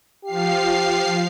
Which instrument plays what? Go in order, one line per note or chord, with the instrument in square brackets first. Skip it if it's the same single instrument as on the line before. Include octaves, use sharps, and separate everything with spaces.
[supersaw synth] F3 F5 C7 [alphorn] G4